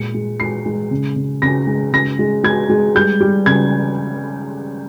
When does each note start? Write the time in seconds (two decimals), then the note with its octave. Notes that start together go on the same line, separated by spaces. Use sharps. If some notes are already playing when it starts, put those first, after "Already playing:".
Already playing: A#2 G#3 C#7
0.14 G#3
0.40 G#3 C7
0.66 G#3
0.91 C#3
1.16 C#3
1.42 C#3 A#6
1.67 G#3
1.93 C#3 A#6
2.19 G#3
2.44 G#3 G#6
2.69 G#3
2.95 G3 G6
3.20 G3
3.46 C#3 G#6